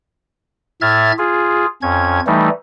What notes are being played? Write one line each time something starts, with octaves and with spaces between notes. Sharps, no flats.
A2 E5 F6 G#6 A6
F4 G#4
F2 C#4 G#6
E3 G3 A3 D#4